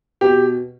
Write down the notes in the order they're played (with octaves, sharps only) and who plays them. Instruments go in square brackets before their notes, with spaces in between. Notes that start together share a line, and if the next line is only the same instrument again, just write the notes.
[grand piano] B2 [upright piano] G4